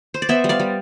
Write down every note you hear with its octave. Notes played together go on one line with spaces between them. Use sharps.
C5
D5
B3 C5 E5
G3
D5 F5
G3